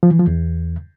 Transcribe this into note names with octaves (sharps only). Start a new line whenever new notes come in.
F3
E3
F3
E2